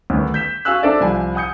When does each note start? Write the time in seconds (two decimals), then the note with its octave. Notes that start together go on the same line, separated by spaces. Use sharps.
0.10 D2 D#3 B3
0.34 G6 B6 E7
0.65 F#4 F5 G#5 E6 F#6
0.83 D4 A4 C5 D5 E5
1.00 C2 F3 G#5
1.35 F#5 G#5 D#6 G6 C#7